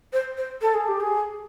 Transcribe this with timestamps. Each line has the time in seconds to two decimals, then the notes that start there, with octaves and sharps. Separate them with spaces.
0.13 C5
0.37 C5
0.62 A4
0.74 G#4
0.88 G4
1.00 G#4